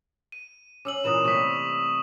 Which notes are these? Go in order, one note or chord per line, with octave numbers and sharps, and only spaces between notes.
D#7
C#4 D6 E6 F#7
A#2 E3 B4 D#6 E7
C3 G3 A3 C#6 D#6 B6